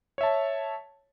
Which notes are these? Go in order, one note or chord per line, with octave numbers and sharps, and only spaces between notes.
C#5 E5 A5